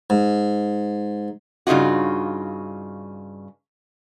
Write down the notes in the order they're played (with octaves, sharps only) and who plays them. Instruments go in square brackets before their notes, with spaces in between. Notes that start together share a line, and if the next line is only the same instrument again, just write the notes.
[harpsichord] G#2
[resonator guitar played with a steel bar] G2 C#3 D#4 F4 F#4